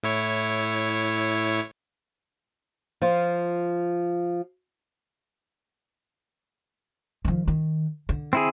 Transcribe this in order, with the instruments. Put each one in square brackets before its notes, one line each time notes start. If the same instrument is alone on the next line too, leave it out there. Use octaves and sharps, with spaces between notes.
[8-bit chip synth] A2 E4 C#5
[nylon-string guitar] F3 F4
[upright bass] D#3 F3
D#3
D3
[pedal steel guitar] C4 E4 G#4